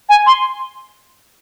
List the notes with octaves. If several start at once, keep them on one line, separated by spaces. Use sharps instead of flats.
G#5
C6